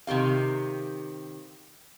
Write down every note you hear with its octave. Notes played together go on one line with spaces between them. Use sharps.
C3 D#3 G4 F5